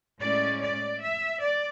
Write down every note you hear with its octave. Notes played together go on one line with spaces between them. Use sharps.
A2 G#3 C#4 D5
D5
E5
D5